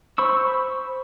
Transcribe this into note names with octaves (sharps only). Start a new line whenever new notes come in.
C5 B5 C#6 E6